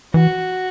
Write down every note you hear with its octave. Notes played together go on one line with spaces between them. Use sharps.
E3 F#4